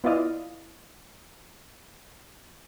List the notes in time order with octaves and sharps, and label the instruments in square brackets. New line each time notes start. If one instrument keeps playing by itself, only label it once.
[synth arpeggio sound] B3 E4 F4 D5 D#5 F5